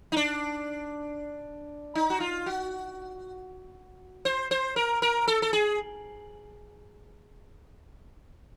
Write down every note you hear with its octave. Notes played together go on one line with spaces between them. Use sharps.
D#4
D4
D#4
F#4
F4
F#4
C5
C5
A#4
A#4
A4
A4
G#4